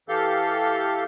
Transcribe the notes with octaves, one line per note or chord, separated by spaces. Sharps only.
E3 G4 A4 F5 G6